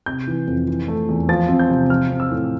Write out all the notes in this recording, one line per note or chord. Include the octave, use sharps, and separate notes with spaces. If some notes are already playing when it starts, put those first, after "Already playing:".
C3 G6
E3
F2
E3
A3
E2
F3 A6
C4
G6
C3
F3 F6
C4
E6
A2